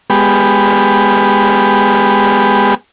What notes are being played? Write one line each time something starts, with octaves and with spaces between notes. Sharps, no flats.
G#3 B3 G4